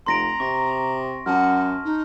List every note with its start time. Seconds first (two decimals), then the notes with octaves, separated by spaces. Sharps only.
0.06 F1 A#5 C6 A#6 D7
0.40 C3 C#6 A#6
1.26 F#2 F#5 A5 F6
1.85 D#4